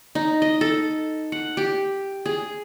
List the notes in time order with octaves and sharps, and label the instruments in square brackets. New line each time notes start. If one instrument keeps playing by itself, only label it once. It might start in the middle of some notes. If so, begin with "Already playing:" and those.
[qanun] D#4
D#5
A4
F#5
G4
G#4